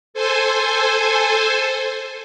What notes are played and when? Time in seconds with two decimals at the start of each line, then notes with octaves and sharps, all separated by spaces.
0.14 A4 C5 G#5